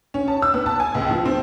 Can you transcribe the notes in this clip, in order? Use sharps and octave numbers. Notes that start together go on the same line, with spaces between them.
C#4
A5
E6
B3
A5
G#5
C#2
F3
C4